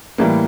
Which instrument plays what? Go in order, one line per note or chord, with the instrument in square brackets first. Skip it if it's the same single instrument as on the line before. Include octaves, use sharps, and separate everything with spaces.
[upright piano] A2 E3 G3 A#3